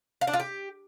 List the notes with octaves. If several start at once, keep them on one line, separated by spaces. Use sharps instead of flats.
F5
D4
F4
G4